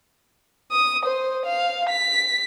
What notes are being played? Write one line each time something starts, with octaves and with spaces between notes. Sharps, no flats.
D#6
C5
F5
B6